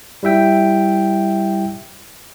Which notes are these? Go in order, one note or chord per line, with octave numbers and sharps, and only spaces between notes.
G3 E4 E5 G5